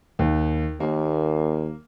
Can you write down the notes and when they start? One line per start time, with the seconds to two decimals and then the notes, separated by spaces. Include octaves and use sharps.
0.19 D#2
0.80 D#2 A#3